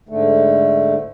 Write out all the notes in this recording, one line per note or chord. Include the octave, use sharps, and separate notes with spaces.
G#2 D3 A3